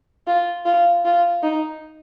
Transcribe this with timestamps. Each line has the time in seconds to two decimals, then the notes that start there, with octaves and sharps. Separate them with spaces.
0.27 F4
0.65 F4
1.05 F4
1.43 D#4